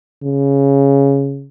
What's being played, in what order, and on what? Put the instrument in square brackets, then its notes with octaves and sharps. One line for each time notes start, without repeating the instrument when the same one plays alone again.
[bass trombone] C#3